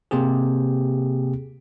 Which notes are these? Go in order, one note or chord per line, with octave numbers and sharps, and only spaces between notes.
C3 A#3 C4 G4 G#4